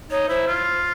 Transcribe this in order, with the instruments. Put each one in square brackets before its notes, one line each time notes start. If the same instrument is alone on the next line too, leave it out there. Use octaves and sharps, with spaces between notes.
[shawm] D#4 [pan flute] C#5
[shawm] E4 [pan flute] C5
[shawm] F4